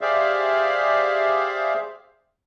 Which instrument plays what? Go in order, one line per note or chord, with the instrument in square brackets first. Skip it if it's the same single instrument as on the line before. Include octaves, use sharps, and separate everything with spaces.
[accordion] G4 G#4 C5 D5 E5 F5